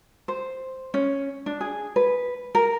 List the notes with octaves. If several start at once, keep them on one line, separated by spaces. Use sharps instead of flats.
C5
C#4
D4
G#4
B4
A#4